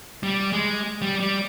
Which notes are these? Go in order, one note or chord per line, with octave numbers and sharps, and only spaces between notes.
G3
G#3
G3
G3